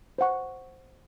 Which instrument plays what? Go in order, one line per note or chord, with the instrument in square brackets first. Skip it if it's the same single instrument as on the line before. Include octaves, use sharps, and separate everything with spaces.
[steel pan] C5 F#5 C#6